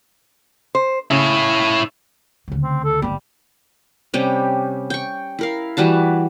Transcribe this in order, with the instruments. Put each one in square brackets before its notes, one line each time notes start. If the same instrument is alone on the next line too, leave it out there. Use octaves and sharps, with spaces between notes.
[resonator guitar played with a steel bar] C5
[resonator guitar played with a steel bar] C#3 [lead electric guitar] E4 C#5
[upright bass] D2 C#3
[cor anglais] C4
A4
[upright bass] G1 A#3 [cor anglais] G3
[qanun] C3 G3 C#4 G4
G5 C#6
E4 A#4 F5
E3 G3 F#4 A5